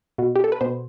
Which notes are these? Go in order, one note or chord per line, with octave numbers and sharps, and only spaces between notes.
B2
G4
A4
B4
B2 C5